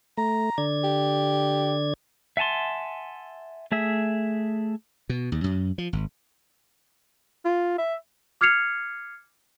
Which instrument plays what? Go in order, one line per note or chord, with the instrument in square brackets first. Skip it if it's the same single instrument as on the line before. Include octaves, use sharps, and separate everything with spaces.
[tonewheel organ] A3 [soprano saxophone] A#5
[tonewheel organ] D3 D5 G#6
[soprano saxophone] G4
[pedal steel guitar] E5 F#5 G#5 A5 C6
A3 G#4 E5
[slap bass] B2
D#2
F#2
F3
G#1
[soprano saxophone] F4
E5
[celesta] D6 F6 G#6 C7 C#7 F7